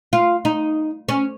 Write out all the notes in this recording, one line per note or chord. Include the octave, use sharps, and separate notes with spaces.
F4
D#4
C#4